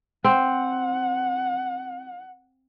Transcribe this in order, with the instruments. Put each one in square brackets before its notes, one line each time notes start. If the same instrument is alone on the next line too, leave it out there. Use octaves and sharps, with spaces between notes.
[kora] C4 [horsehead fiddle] F#5